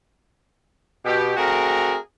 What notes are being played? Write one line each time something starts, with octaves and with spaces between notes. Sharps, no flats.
B2 G4
A3 C4 F#4 G#4 A#4